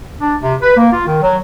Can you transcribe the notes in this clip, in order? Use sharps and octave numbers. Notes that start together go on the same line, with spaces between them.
D4
C3
B4
A#3
F4
D#3
F#3